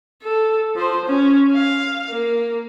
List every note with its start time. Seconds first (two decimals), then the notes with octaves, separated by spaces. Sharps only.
0.23 A4
0.75 F3 C5
1.06 C#4
1.53 F5
2.10 A#3